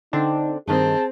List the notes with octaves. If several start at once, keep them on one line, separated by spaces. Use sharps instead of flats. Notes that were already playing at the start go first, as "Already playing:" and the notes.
D3 C4 D4 D#4
G2 D#3 C4 G#4 A5